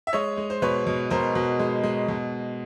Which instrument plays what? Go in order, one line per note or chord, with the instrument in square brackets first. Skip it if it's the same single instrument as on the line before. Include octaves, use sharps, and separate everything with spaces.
[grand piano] E5
G#3 C#5 D#5
G#3
C5
B2 B4 C#5
B2
B2 A#4 C5
B2
G#3
G#3
B2